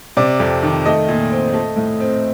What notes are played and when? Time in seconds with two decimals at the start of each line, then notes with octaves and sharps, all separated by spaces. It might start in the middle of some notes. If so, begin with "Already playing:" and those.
0.17 C3 D5
0.40 F2
0.63 D#3
0.86 A3 D#5
1.08 A#2
1.32 C4
1.54 A3
1.76 A2
2.00 C4